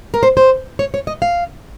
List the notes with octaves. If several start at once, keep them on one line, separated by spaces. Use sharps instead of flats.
A#4
C5
C5
C#5
C#5
D#5
F5